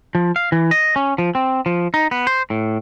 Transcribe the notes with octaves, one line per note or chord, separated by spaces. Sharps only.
F3
F5
E3
D#5
C#4
F3
C4
F3
D#4
B3
C5
A2